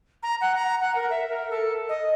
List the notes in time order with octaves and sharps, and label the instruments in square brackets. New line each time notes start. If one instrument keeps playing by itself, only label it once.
[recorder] A#5
F#5
A#5
F#5
A#4
E5
A#4
A4
D#5